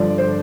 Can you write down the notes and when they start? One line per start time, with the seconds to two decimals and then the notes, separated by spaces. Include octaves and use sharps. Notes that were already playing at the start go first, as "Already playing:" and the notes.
Already playing: G2 D3 F3 D5
0.18 C5